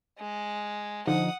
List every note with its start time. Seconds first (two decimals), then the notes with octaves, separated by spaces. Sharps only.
0.19 G#3
1.07 D3 F3 D#4 F#5 D#6